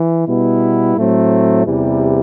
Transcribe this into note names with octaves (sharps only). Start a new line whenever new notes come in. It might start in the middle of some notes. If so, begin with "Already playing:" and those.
Already playing: E3
B2 G3 B3 E4
A2 F#3 A3 C4
E2 C3 E3 G3